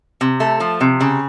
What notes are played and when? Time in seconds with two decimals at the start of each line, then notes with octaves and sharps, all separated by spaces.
0.21 C3
0.40 A3
0.60 F3
0.81 C3
1.01 C#3